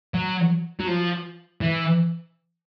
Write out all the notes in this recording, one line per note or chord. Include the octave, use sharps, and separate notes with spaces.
F#3
F#3
F3
E3